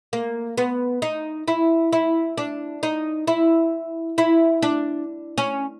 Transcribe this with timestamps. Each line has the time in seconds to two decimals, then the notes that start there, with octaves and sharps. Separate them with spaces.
0.13 A#3
0.57 B3
1.02 D#4
1.48 E4
1.93 E4
2.38 D4
2.83 D#4
3.27 E4
4.18 E4
4.62 D4
5.38 C#4